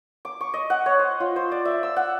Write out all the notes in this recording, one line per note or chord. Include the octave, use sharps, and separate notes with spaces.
D6
C#6
D#5
F#5
C#5
C5
F4
C5
D5
E5
E6
F#5